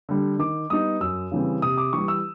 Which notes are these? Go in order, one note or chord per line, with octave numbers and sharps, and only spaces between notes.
D3 G3
D#3 D6
G3 B3 D#4 D#6
F#2 E6
C#3 E3 G3 C4
C3 D#6
D6
E3 G3 C#6
E6